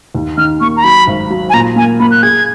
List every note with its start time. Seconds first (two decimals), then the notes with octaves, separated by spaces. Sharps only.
0.15 D#2
0.37 D#3 F6
0.61 A#3 C#6
0.77 A#5
0.83 F#3 B5
1.07 G#1
1.30 F#3
1.50 G#5
1.53 A#2 A#5
1.76 A#3 G#5
2.00 A#3 B5
2.11 F#6
2.23 G#4 G#6